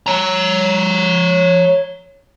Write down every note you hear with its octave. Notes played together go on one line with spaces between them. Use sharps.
C#5 A#5